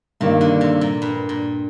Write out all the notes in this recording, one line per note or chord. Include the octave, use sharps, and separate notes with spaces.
G2 C3 D#3 A#3
D3
C3
A#2
G2
A#2